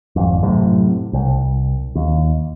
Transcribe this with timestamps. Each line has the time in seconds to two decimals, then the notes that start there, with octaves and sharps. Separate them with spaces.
0.16 G#1 F2
0.43 F#2 A2 C3
1.13 C2
1.95 D#2